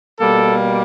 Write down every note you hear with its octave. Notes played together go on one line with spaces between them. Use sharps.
B2 G3 A#3 A4